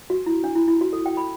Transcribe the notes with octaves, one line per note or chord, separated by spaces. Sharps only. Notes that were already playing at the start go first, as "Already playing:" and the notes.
F#4
E4
D4
E4
E4
F#4
A4
G5
B5